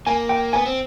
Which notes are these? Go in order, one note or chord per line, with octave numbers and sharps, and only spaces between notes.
A#3 G#5
G5
B3 G#5
C4